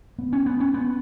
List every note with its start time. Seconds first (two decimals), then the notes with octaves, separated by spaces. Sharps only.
0.18 B3
0.33 C#4
0.46 B3
0.60 C#4
0.74 B3